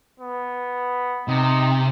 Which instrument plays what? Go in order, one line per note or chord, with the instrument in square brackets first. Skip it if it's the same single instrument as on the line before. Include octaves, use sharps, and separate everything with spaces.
[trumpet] B3
[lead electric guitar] C3 [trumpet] D#4